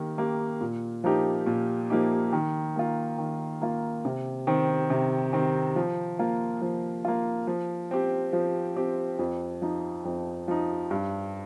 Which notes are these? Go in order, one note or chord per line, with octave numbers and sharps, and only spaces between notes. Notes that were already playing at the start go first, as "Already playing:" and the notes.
Already playing: D#3 A#3 G4
A#3 G4
A#2
F3 A#3 D#4 G4
A#2
F3 A#3 D#4 G4
D#3
A#3 F4
D#3
A#3 F4
C3
D#3 C4
C3
D#3 C4
F3
A#3 F4
F3
A#3 F4
F3
C4 G4
F3
C4 G4
F2
F3 D#4
F2
F3 D#4
G2